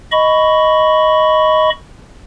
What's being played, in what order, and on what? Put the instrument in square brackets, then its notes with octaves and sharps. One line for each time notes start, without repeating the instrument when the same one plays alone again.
[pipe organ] D#5 B5 C#6